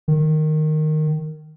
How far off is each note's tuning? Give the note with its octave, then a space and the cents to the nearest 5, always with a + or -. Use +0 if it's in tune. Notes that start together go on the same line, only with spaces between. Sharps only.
D#3 -10